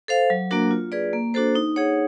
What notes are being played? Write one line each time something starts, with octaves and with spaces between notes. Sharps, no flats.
A4 C5 F5
F#3
A#3 D4 F#4 A#4
F4
G#4 B4 D5
A#3
D4 F#4 A4 C5
D#4
G#4 C#5 F#5